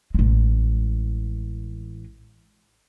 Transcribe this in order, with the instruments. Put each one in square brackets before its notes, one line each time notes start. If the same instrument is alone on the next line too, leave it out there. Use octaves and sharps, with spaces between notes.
[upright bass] A1 G#3